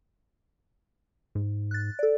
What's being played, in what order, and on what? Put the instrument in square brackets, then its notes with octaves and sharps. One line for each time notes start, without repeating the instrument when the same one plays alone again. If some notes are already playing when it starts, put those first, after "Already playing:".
[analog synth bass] G#2
[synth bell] F#6 A6
A4 D5